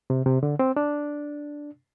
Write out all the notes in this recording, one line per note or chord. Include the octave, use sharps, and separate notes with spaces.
C3
C3
D3
C4
D4